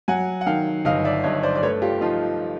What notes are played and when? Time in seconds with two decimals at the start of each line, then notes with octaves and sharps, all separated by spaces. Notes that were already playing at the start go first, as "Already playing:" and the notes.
0.08 F#3 F#5 G#5
0.41 F#5
0.46 D#3 F5 G5
0.85 G1 D#5 F5
1.05 D5 E5
1.24 G2 C#5 D#5
1.43 C5 D5
1.55 D5
1.63 A3 B4 C#5
1.82 F4 G4
2.01 F3 D#4 F4